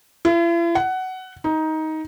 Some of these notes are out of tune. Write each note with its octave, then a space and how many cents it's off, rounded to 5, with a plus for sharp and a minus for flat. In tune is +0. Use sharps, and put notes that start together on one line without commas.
E4 +45
F#5 +15
D#4 +15